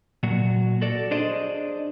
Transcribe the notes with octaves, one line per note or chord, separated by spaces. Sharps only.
A#2 F#3 F#4
F#4 A4 D5
D4 G#4 C5 D5 D#5